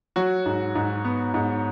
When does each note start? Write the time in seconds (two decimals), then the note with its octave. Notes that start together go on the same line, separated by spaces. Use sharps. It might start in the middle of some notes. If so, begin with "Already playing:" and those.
0.16 F#3 F#4
0.46 G#2
0.75 G#2
1.05 B3
1.34 G#2